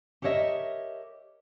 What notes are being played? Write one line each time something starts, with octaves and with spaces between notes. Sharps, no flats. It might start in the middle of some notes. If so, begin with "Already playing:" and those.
G4 A4 A#4 C#5 D#5 E5